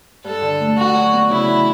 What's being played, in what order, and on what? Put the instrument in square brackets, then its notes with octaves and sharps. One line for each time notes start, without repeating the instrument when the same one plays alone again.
[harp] G2 [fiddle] A4
[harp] D3
A3
[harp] D3 [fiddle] F#4
[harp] F#3
B3
[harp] C#3 [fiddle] E4
[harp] E3